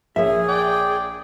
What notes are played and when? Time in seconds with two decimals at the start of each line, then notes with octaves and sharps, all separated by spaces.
0.16 A#1 A#3 G#4 C#5 E5
0.49 D5 G5